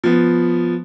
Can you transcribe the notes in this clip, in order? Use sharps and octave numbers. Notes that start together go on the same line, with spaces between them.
F3 B3